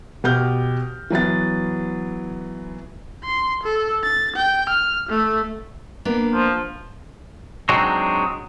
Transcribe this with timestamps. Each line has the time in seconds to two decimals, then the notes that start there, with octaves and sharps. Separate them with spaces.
0.24 B2 G4 F6 G6
1.10 E3 F#3 B3 A6
3.24 C6
3.63 A4
4.03 A6
4.36 G5
4.69 F6
5.09 A3
6.05 A#3 B3 D4
6.34 F3
7.69 F#3 G#3 C4 D4 D#4 F#4